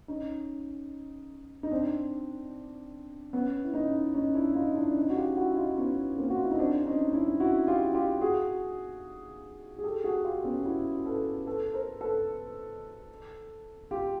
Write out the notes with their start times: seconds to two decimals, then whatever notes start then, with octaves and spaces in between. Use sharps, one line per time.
0.08 C#4 D#4
1.63 D#4
1.71 C4 D4
3.33 B3 C#4
3.64 E4
3.74 C#4 D#4
4.14 C#4 D#4
4.35 D4 E4
4.55 D#4 F4
4.76 D4 E4
4.91 D4
4.96 C#4 D#4
5.10 F#4
5.16 F4 G4
5.37 E4 F#4
5.57 D#4 F4
5.77 B3 C#4
6.18 A#3 C4
6.30 F#4
6.36 F4
6.44 E4
6.51 D#4
6.59 C4 D4
6.86 C#4 D#4
7.13 D4 E4
7.40 E4 F#4
7.67 F4 G4
7.94 F4 G4
8.21 F#4 G#4
9.78 G#4
9.83 G4 A4
10.04 F#4 G#4
10.24 F4 G4
10.44 B3 C#4
10.65 E4 F#4
11.06 A4 B4
11.46 A4 B4
11.74 A#4 C5
12.01 A4 B4
13.91 F4 G4